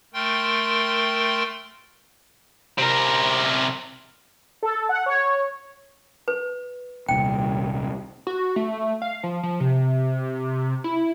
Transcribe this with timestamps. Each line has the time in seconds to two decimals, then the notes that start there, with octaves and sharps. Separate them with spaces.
0.14 A3 A#4 G5 C6
2.78 C3 A#4
4.63 A4
4.89 F#5
5.06 C#5
6.28 B4
7.09 D#1 C2 G5
8.27 F#4
8.56 A3
9.02 F5
9.23 F3
9.43 F3
9.60 C3
10.84 E4